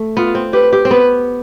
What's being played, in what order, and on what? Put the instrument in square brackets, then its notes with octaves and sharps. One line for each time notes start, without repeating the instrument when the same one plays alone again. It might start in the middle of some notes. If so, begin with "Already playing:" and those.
Already playing: [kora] A3
[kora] B3 [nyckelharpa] F4
[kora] C4
[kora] G4 [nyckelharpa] B4
[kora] G4
C4
[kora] B3 [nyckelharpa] B4